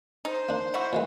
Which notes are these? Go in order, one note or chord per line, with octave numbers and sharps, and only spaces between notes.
D#4 C5
A#3 D4
D#4 E4 F#4
A#2 E3 G#3